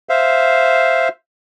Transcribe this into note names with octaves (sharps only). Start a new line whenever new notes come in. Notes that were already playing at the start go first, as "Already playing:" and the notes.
C5 E5 F5